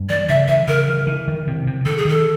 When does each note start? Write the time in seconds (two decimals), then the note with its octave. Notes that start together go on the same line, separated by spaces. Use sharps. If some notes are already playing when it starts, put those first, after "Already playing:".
Already playing: G2
0.09 E3 D5
0.29 C#3 E5
0.48 E3 E5
0.67 C#3 A#4
0.88 E3
1.07 E3
1.28 D#3
1.47 C3
1.67 C3
1.85 D#3 A4
1.98 G#4
2.05 D#3 A4